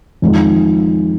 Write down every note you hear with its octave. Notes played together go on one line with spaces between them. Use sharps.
F2 D#3 G#3 D#4